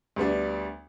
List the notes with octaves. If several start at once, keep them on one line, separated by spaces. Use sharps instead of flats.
D2 G3 B3 D4